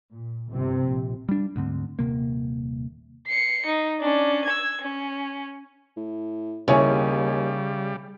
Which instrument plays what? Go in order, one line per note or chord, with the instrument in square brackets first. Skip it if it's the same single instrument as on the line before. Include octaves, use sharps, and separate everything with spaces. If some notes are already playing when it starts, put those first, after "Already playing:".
[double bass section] A#2
G1 C3 C4
A#1
[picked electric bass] G3 D4
D2 G#2 D3 C4
D#1 C3 A#3
[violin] C7 C#7
D#4
C#4 D4
E6 G#6
C#4
[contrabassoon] A2
[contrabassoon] D#2 [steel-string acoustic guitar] C#3 [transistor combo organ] G3 [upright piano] E4 C#5 G#5